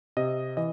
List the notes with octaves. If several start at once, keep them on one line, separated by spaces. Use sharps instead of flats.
C3 D#5
E3 D#5